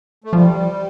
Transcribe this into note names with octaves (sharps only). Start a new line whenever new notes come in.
A3
F3 G3